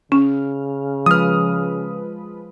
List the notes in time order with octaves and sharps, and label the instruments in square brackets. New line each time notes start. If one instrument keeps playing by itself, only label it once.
[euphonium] C#3 [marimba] C#4 [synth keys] F6
[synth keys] F3 G#3 B4 [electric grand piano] D#6 F6